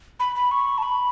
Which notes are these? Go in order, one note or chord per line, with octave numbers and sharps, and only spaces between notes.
B5
B5
C#6
A5
B5